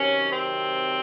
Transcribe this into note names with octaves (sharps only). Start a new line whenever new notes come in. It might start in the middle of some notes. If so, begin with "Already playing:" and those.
Already playing: C3 D#3 F#3 C#4
C4